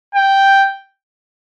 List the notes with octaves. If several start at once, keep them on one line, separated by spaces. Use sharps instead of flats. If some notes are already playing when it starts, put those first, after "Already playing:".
G5